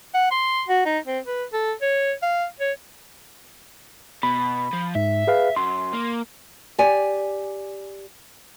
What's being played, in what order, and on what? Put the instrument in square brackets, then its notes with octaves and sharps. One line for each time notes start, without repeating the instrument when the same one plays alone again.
[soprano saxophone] F#5
C6
F#4
D#4
C4
B4
A4
C#5
F5
C#5
[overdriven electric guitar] B2 [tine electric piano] B5
[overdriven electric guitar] F3
[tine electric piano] G#2 [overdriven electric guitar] E5
[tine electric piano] G#4 B4 F5
[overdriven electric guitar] F#2 [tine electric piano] C6
[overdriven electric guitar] A#3
[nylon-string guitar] G4 D5 G#5